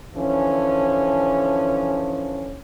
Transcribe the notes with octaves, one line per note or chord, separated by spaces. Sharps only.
D3 E3 F3 C#4